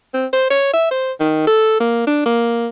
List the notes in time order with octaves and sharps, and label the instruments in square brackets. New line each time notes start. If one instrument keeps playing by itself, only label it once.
[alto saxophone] C4
C5
C#5
E5
C5
D#3
A4
A#3
D4
A#3